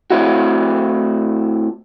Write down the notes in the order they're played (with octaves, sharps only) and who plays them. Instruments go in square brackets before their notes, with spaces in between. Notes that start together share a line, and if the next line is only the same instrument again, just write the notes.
[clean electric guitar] A2 C4 E4 F#4